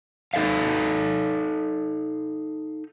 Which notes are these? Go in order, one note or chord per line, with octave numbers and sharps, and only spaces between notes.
D#4 A4 D#5 F5